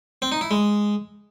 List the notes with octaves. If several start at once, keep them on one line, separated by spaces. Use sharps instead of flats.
C4
D#4
E4
G#3